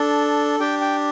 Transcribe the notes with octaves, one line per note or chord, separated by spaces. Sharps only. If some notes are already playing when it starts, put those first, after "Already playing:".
Already playing: D4 A4
D4 G4 G5
G5